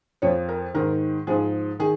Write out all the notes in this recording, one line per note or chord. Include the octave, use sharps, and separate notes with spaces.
F2 F3 C#5
A#4
G#2 D#3 A#4
G#2 F3 G#4
D#3 G#4